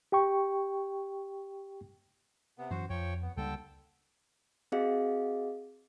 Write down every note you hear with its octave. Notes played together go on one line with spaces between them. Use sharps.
G4 G5 C#6
C3 B3
F#2 E3 F#3 F#4 C5
F2 F3 C#5 G5
B3
C#2 D3 G3 A#3 A4 G5
C4 F#4 G#4 D#5 F5